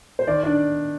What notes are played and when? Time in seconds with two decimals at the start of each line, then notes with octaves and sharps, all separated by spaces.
0.19 C5
0.27 D#3 D5
0.43 D4 D5